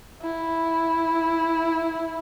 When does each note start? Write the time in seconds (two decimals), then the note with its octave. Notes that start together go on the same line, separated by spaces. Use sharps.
0.22 E4